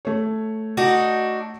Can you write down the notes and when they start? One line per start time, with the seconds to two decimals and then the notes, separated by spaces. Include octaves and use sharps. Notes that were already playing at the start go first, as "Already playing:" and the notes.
0.05 A3 C#5
0.77 D4 D#4 F#4